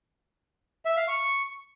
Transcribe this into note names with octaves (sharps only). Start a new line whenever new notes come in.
E5
F5
C#6